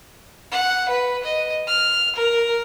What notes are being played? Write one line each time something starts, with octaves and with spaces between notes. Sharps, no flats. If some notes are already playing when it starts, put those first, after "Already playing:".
F#5
B4
D#5
F6
A#4